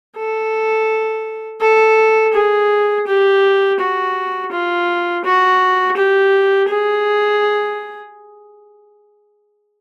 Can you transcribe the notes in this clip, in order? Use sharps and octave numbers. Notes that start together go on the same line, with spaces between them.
A4
A4
G#4
G4
F#4
F4
F#4
G4
G#4